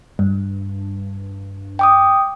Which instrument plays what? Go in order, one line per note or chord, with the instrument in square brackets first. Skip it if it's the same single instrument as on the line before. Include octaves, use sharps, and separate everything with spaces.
[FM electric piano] G2
[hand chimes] G5 D6 D#6